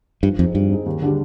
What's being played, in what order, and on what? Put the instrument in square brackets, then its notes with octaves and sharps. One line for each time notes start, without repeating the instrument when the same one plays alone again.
[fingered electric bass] G2 [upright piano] F3
[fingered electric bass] F2 [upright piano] C4 D#4 G#4
[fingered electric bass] G2 [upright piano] F3
[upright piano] C4 D#4 G#4
D#2
D3 G3 D4 G4